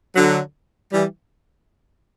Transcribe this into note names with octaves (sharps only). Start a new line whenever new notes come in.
D3 F#3
E3 G3